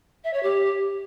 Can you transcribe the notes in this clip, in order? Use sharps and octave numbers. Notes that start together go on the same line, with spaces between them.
E5
C#5
G4